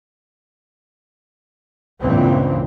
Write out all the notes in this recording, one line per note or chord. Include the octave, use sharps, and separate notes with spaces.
C#2 G2 A#2 E3 C4